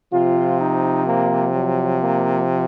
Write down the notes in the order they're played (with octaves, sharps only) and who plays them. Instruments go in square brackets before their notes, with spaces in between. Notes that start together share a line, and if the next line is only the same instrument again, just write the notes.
[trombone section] C3 F3 F4
D#4
A#3
F#3
A#3